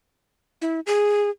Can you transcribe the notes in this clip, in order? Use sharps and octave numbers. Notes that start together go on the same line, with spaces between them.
E4
G#4